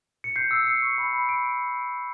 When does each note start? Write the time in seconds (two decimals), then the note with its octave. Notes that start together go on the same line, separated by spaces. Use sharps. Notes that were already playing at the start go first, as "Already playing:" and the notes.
0.24 C#7
0.36 G6 C7
0.51 E6
0.67 E6 C#7
0.82 C#6
0.98 B5
1.13 B5
1.29 B5 D7